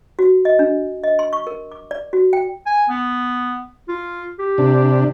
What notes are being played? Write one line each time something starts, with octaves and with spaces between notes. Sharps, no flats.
F#4
D#5
D4
D#5
C6
C#6
A#4
D6
D5
F#4
G5
G#5
B3
F4
G4
C3 D4